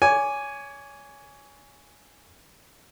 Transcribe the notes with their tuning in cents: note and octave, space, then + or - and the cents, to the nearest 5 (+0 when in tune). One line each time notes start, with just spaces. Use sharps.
C#5 +25 G#5 +0 D6 +0